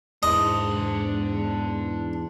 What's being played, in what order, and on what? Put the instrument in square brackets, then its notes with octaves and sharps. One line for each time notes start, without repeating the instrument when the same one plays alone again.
[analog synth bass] E2 [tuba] G#2 [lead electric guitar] D4 C6 [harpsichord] D#5